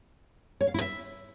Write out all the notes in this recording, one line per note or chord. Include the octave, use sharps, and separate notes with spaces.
C#5
F5
E4
E5